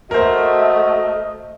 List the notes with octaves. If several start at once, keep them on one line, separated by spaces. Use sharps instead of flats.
A3 F#4 A#4 C5 D#5